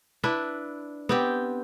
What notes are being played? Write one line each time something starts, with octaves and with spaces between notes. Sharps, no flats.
D4 E4 B4
B3 C4 G4